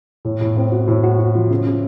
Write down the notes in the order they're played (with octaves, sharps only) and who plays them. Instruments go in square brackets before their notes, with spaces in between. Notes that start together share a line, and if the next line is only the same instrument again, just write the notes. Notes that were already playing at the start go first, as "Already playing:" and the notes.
[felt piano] A2
A2
C4
F#4
A2
F#4
F#4
F3
C#3
C#3